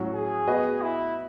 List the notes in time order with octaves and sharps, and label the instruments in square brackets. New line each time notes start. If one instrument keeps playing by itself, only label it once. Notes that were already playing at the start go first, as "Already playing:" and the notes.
Already playing: [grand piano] A2 F#3 C#4 F#4
[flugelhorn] G#4
[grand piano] B3 F#4 B4 D#5
[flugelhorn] E4